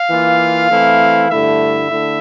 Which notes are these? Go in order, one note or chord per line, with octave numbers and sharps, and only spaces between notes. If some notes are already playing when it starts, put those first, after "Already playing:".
Already playing: F5
E3 A#3 F4
E3 A3 C4 E4
G2 D3 A3 E4 E5
D3 A3 E4